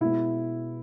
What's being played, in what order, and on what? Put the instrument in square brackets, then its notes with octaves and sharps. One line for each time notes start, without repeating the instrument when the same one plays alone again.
[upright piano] B2 G#3 B3 E4